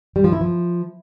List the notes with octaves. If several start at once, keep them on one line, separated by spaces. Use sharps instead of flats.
G3
F3
E4
F3